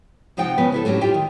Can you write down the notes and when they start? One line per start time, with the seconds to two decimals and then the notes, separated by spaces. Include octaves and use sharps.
0.37 C3 F3 D#4 F#5 G5
0.58 C#3 F3 B3 B4
0.72 B3 E4 A4
0.85 A2 F#3 C#4 D4 G4
1.01 F4 G4 E5 G5
1.14 D#3